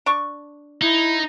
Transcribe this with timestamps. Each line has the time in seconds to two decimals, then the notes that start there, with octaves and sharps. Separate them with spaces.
0.06 D4 C#6
0.82 D#4 E4